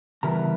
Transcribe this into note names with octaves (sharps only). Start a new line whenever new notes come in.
C#3 E3 G3 B3 E4 A#4 A#5